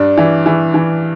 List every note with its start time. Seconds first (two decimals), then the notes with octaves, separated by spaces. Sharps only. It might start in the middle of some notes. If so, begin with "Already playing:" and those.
Already playing: G2 D4
0.18 E3
0.46 E3
0.74 E3